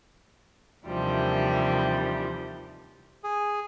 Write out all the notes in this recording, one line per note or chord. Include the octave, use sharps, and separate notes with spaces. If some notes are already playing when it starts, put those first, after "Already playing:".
D#2 C3 E3 F3 G3 D4
G#4